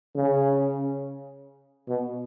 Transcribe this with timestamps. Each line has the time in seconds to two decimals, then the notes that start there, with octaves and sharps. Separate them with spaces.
0.16 C#3
1.88 B2